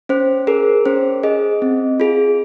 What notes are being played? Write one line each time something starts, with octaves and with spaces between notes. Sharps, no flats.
C#4 C5
G#4 A#4
C#4 C5
G#4 D#5
C4
F4 G#4